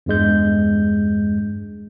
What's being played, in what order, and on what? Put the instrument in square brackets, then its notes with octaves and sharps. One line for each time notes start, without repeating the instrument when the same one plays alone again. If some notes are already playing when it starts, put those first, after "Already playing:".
[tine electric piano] E2 G2 G#3 G6